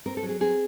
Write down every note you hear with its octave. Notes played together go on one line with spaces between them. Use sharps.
C4 A#4
A4
F#3
G#4
C4 G#4